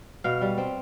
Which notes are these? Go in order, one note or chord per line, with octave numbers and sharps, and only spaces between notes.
B2 F5
G3
C4